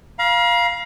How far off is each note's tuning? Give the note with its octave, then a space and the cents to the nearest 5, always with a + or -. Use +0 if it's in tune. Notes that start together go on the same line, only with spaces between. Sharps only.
F5 +0 A#5 +45